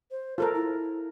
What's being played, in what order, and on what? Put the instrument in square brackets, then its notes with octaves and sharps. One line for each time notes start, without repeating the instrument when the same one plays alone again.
[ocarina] C5
[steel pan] F4 A4 A#4 [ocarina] C5
[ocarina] E4